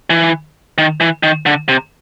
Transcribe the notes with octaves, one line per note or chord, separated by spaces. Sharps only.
E3
D#3
E3
D#3
D3
C3